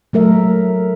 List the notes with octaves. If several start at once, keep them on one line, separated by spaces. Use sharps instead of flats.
F#3 A3 A#4 E5